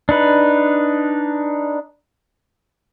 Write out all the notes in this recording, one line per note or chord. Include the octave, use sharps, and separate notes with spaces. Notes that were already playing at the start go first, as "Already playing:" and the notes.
D4 D#4 B4